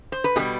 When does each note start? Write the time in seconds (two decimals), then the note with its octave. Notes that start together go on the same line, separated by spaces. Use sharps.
0.12 C5
0.24 B4
0.36 B2 G#4
0.39 G3